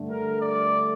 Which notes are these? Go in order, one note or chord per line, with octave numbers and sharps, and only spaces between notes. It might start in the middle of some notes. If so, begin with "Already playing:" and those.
Already playing: G2 D3 A3
A#4
D5